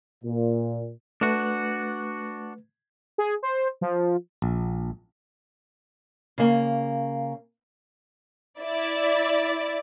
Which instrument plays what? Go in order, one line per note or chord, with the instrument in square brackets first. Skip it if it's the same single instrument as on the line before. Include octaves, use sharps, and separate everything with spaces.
[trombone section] A#2
[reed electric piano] A3 B4 [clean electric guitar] D4 F#4
[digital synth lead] G#4
C5
F3
[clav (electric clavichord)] A#1
[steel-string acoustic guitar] C#3 A#3
[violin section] E4 D5